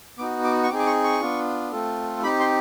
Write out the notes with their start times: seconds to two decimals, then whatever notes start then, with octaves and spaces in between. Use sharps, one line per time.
0.18 B3 D#4 F#4 D6
0.44 D6
0.63 C#6
0.69 C4 D#4 G#4 D6
0.79 D6
0.87 C#6
1.04 C#6
1.21 B3 D4 F4
1.72 A3 C4 F4 A4
2.22 C4 D#4 G4 B5
2.40 C6